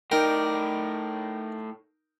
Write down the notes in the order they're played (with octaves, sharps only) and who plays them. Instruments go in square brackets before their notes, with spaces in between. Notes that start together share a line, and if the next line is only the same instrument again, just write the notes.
[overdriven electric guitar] A2 D5 [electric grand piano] D#4 G5 [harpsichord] A#4